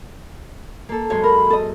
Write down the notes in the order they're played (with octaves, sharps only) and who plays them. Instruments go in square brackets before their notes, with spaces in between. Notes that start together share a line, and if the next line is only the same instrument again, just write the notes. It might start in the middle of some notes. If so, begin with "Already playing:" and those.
[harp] A#3 A4
[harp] F#2 G#3 C6 [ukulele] C#5
[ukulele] A#4 [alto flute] B5
[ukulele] A4 D#5